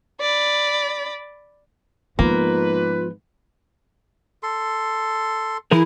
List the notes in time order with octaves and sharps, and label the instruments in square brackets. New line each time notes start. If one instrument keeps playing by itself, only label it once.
[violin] D5 B5
[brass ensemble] G#2 B4 [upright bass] F3 B3 [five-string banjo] A#3 [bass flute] F4
[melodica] A4 C6
[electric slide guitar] E3 G#4 A#4 [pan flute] E4